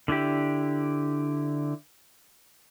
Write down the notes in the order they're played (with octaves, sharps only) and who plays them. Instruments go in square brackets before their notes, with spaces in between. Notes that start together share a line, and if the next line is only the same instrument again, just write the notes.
[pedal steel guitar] D3 D4 E4 G4